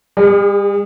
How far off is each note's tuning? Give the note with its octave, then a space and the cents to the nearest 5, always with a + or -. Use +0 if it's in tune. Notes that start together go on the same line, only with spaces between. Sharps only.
G3 +40 G#4 -20